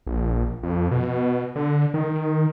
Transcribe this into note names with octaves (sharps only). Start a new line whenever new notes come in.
A#1
F2
B2
D3
D#3